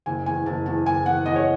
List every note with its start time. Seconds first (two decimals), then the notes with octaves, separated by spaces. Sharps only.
0.06 F#1 G#5
0.26 E2 G#5
0.46 F#1 A5
0.66 E2 A5
0.86 F#1 G#5
1.06 E2 F#5
1.26 E2 D#5
1.36 C#5